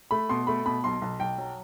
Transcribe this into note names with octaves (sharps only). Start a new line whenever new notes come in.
A3 B5
B2 C6
A3 B5
B2 B5
B1 C6
B1
B1 G5
F#3